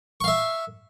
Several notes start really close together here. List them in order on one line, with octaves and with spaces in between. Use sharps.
C#6 F5 E5